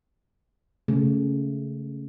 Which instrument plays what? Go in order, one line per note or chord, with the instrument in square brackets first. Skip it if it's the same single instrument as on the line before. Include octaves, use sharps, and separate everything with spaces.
[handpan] C#3 A3